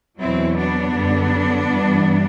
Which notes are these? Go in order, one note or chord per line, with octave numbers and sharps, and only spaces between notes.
E2 B2 F#3 C4 E4
B3 D4
F#2 D3 G3
G2 E3 G3